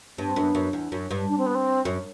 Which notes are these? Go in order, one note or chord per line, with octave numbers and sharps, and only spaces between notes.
G2 B3
C4
F#2 B3
F#2
E2
F#2
G2
D4
C4
B3
C4
F#2